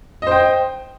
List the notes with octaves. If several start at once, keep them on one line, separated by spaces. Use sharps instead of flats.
C5 D#5 G5